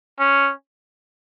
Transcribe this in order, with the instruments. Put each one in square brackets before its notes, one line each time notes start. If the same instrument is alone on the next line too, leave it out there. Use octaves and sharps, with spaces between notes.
[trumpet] C#4